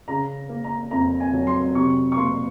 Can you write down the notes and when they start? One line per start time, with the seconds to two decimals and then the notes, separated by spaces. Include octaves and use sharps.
0.08 C#3 A#5
0.49 A#3
0.64 A#5
0.91 F2 A#5
1.20 G#5
1.33 F#3
1.47 C6
1.75 C3 C#6
2.12 C#6
2.17 A#3 C6